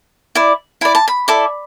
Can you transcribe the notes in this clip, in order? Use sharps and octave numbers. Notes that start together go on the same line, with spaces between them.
E4 D5
E4 D5 B5
A5
B5
E4 A4 D5